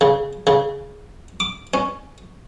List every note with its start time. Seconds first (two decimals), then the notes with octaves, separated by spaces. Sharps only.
0.01 C#3
0.47 C#3
1.40 D6
1.74 C#4